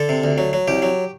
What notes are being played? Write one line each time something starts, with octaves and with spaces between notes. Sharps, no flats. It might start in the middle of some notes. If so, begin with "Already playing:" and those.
Already playing: D3 A4
C3
D2
F#3
F#3
C2 G4
F#3